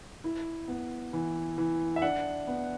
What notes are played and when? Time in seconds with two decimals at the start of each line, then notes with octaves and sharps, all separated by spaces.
0.24 E4
0.68 B3
1.13 E3
1.58 E3
1.96 E5
2.02 D4 F#5
2.47 B3